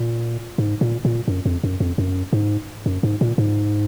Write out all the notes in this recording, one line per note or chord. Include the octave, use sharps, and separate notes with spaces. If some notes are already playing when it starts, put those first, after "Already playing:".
Already playing: A#2
G#2
A#2
A#2
F#2
F2
F#2
F2
F#2
G#2
F#2
G#2
A#2
G#2